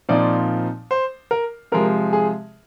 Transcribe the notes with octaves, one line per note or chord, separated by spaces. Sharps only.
A#2 F3 C4 D#4 D5
C5
A#4
C3 F3 G#3 A#4
G#4